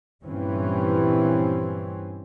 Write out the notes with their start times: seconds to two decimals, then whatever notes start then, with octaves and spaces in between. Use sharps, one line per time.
0.25 G2 A#2 E3 G3 C4 C#4